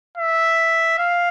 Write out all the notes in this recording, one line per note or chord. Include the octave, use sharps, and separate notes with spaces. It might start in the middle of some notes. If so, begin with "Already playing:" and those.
E5
F5